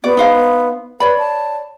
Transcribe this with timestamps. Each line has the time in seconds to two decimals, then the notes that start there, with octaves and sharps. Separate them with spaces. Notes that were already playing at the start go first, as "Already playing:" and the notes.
0.04 B3 F#4 D5
0.17 D#4 C5 F5
1.00 B4 C#5 D5 B5
1.18 A5